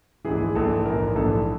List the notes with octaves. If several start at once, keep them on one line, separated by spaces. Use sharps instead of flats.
A#1 G#2 E3 G#4
A#1 G#2 E3 A4
A#1 G#2 E3 A#4
A#1 G#2 E3 A4